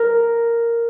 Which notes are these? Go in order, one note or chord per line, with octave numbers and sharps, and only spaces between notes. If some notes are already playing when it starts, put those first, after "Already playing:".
Already playing: A#4